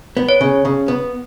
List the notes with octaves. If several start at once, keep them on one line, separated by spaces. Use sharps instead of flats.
B3
C#5
C#3
C#3
B3